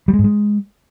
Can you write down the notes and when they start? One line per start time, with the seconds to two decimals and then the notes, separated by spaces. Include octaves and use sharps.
0.08 G3
0.13 G#3
0.19 G#2
0.24 G#3